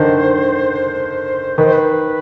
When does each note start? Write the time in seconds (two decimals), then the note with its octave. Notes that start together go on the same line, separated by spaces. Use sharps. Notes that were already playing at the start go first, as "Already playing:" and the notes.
Already playing: D3 D#3 C5
1.58 D#3 B4
1.65 C5
1.73 B4